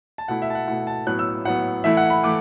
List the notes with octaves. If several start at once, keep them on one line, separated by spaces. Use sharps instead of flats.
A5
B2 A3 E4 F#5
E5
A5
F#5
B2 A3 E4 F#5
A5
A2 F#3 B3 F#6
E6
A2 F#3 B3 F#5
E3 A3 E4 E5
F#5
B5
E3 A3 D6